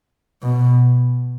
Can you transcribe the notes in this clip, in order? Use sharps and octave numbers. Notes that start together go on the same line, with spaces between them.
B2